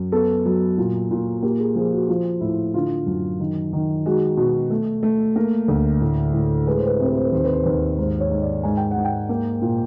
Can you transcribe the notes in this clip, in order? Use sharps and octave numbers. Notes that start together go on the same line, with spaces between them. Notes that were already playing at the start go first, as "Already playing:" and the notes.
Already playing: F#2
B3 A4
F#3
A#2
A#2
A#3 G4
G#4
F3 G#4
F#4
F3 F4
A2 E4
D3 F4
F#2
D#3
D#3
G#3 F#4
B2
A3
A3
A#3 A#4
D2
A2
A2
G#3 B4
C5
B4
C3 C5
B4
C5
B4
D#2 C5
B4
C5
D#2 B4
G#2 C5
C#5
G#2
D5
G#2 G#5
G5
F#5
G#2
G5
A#3
A#2